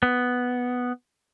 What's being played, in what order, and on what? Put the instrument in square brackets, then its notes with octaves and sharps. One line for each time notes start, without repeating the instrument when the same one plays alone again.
[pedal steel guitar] B3